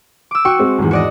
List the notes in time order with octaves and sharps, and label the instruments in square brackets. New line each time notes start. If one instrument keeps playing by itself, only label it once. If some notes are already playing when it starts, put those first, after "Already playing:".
[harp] D6 E6
[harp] F#4 C#6 [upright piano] G5
[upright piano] G#3 C4
G#1 E2
[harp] F#4 D5 D#5